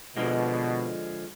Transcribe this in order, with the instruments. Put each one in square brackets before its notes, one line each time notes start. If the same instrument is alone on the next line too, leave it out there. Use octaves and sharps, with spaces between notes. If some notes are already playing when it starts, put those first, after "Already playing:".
[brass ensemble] B2 [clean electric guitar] D3 F3 G#3